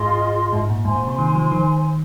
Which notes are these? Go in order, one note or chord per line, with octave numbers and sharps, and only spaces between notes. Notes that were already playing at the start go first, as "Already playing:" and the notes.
Already playing: G#2 F4 G#4 D#5 C6
G#2
A#2
G#2 C5 G#5 C6
A#2
C3
D#3
F3
D#3